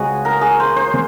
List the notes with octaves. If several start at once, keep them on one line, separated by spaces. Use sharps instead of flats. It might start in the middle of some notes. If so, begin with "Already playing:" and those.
Already playing: C#2 C#3 G#3 C4 F#4 G#4
A#4
G#4
C5
C5